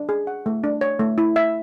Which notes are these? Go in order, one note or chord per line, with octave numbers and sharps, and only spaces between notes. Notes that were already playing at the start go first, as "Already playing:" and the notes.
Already playing: D4
G#4
F#5
A3
D4
C#5
A3
E4
E5